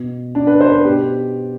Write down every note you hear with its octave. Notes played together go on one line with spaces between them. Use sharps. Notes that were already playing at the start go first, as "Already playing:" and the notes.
Already playing: B2
D4
B4
C5
B4
B2 G4